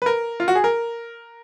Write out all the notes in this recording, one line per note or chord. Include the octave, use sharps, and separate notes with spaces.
B4
A#4
F4
F#4
G#4
A#4